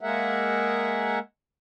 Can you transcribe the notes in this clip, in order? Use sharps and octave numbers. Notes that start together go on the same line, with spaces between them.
G#3 A#3 G#4 A#4 E5 F#5